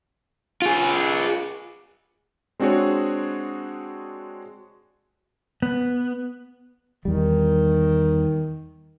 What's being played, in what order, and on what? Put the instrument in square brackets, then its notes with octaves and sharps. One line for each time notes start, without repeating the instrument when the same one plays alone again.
[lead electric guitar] F4 G#4
[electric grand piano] G#3 C4 D4 F#4 G#4 C#5
[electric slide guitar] B3
[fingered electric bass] E2 G3 [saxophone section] D#3